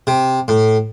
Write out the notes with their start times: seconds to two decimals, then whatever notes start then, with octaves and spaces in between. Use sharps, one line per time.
0.07 C3
0.48 A2